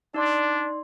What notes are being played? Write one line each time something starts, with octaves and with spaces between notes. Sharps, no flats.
D4 D#4 D5 C6